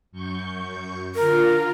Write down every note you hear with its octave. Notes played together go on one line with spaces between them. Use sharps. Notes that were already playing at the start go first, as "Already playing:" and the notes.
F#2 C#6 G6
D3 F4 A#4